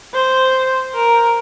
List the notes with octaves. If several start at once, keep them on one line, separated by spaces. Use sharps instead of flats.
C5
A#4